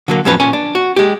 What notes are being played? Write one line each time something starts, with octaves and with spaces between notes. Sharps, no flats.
D3 F#3 A#3
F2 A2 F3 F#3 C#4 B4
A#2 C#4 G#5
D4
F#4
G#3 G4